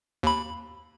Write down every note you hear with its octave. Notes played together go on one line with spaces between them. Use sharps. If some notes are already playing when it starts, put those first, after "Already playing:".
D#2 B5